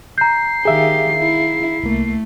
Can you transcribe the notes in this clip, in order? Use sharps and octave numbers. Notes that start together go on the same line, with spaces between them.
A#5 G6 C7
D#3 G4 G#4 E5 F5
E4
C2 A3 A#3